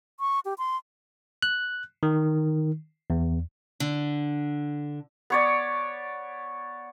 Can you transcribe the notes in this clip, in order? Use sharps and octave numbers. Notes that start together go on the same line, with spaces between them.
C#6
G4
C6
F#6
D#3
E2
D3
B3 C#5 D5